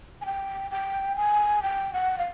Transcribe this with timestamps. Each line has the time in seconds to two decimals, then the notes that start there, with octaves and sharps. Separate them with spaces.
0.21 G#5
0.26 G5
0.71 G5
1.16 G#5
1.63 G5
1.93 F#5
2.18 F5